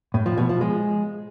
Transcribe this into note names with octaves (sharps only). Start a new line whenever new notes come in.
A2
F3
B2
F3
G#3